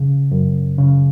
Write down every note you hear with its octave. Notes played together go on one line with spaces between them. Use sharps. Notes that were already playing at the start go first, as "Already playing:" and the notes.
Already playing: C#3
F#2
C#3